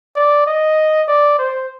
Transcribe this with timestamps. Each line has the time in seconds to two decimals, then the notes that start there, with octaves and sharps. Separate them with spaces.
0.16 D5
0.46 D#5
1.08 D5
1.38 C5